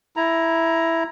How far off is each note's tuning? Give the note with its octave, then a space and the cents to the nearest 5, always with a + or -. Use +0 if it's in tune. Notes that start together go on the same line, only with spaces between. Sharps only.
E4 +0 A#5 +10